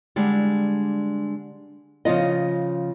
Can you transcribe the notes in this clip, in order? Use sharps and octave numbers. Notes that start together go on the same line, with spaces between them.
D3 G3 G#3
C#3 F3 F4 D#5